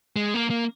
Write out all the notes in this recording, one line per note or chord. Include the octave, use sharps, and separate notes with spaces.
G#3
A#3
A#3